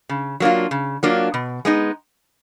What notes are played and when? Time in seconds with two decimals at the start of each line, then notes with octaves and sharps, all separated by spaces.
0.09 C#3
0.40 F#3 A#3 D4 F4
0.71 C#3
1.03 F#3 A#3 D4 F4
1.34 B2
1.65 G#3 B3 D#4